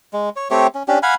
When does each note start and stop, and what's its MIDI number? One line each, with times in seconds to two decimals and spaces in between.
0.13 0.29 56
0.36 0.48 73
0.51 0.67 57
0.51 0.67 60
0.51 0.67 67
0.51 0.67 73
0.75 0.83 61
0.88 0.99 61
0.88 0.99 62
0.88 0.99 67
1.03 1.15 77
1.03 1.15 78
1.03 1.15 80
1.03 1.15 83